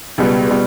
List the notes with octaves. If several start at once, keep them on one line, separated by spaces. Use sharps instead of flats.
C#2 B2 G3 B3
B2 G3